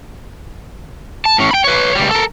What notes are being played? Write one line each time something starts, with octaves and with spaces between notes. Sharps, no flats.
A5
A2 C#4
G5 B5
B4 C#5
C#2 G3
A4 A#4